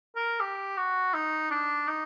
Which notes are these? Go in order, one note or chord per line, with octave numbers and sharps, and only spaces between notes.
A#4
G4
F#4
D#4
D4
D#4